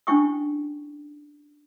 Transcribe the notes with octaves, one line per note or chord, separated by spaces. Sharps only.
C#4 D4 E4 G5 C#6 D#6